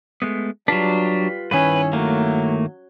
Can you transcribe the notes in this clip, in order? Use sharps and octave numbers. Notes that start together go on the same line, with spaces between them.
G#3 A3 B3
F#3 G3 D4 F4 B4
G2 D#3 C#4 E4 B4
F#3 A3 A#3